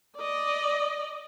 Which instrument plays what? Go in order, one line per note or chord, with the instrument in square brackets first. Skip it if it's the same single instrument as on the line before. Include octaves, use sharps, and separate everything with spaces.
[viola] D5 D#5